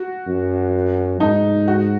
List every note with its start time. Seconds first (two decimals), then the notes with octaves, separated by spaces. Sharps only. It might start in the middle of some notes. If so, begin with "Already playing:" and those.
Already playing: F#4
0.28 F#2
1.20 G#2 D#4
1.68 F#4